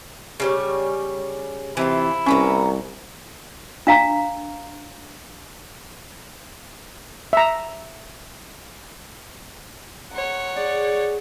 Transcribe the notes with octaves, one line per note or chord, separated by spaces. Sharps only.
C#3 G3 C#5
C3 E3 E4 F4
C2 A#3 B3 C#4 A#5
D4 F5 A#5
E5 A#5
C#5 F#5 A#5 C6
G#4 D5